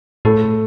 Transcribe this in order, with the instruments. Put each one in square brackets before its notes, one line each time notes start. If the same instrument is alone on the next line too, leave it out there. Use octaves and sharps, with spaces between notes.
[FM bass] A2 [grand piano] A3